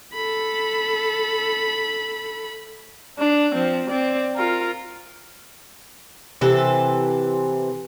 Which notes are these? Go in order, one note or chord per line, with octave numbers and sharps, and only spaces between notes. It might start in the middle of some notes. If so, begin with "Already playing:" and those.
A4 B5
D4
F3 C4
C4 D5
F4 A#4
C3 E3 C4 A4